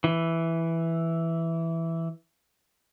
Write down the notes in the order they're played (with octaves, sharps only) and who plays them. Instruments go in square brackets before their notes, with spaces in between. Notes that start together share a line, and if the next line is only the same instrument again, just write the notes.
[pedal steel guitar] E3 E4